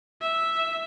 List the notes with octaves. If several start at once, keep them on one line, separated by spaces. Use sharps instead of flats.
E5